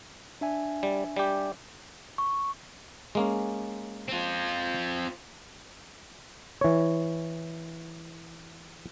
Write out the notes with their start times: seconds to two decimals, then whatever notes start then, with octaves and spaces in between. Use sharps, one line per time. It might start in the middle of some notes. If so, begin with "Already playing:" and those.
0.41 D4 E5 G#5
0.83 G3
1.16 G3 G4
2.18 C#6
3.15 G#3 A#3 C#4
4.08 C4 F4
6.61 E3 C#5